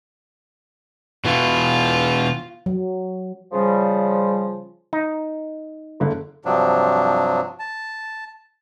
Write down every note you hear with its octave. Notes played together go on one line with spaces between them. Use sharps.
B2 E3 F4
F#3
C#3 F3 G3
D#4
F#1 D3
G2 C3 F3 F#3 D4
A5